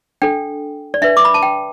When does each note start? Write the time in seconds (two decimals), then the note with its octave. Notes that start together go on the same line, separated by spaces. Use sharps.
0.22 D4 A4 G5
0.94 D5
1.02 D4 B4 E5
1.17 D6
1.25 B5
1.34 A5
1.43 G5